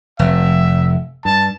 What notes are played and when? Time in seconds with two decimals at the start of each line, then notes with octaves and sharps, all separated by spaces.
0.19 F1 E5
1.25 G2 A5